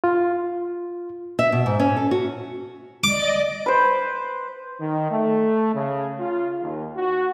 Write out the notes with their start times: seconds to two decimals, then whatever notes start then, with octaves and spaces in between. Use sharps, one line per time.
0.04 F4
1.39 E5
1.52 B2
1.66 G#2
1.80 C#4
1.97 A4
2.11 F#4
3.04 D5 D#5 D6
3.66 B4 C5
4.80 D#3
5.11 A3
5.74 C#3
6.20 F4
6.61 D#2
6.97 F#4